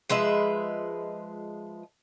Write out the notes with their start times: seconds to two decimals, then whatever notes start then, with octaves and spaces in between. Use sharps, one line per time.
0.10 F3 G#3 B4 E5